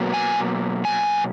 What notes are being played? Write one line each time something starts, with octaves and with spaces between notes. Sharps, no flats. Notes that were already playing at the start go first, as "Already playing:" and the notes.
Already playing: B2 F#3 A#3
G#5
G#5